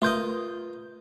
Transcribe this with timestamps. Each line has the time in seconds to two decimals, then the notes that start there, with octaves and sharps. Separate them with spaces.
0.02 A3 F4 A#4 B4 D#5 C6 G6